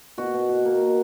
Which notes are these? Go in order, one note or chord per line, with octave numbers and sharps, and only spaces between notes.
B2 F#4
B2
B2
A#3
B2